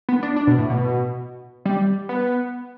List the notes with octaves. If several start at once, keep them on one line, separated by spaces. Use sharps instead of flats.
B3
D4
D4
B2
A2
B2
G3
B3